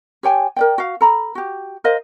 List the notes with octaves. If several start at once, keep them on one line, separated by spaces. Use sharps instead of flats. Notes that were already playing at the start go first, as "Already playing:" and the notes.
G4 C#5 G5 G#5
A#4 D5 G5
F#4 F5
A4 A#5 B5
F#4 G4
A#4 C5 D#5 F5